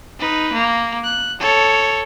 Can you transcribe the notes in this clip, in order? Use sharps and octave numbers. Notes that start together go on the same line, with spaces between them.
D#4 B4
A#3
F#6
A4 C#5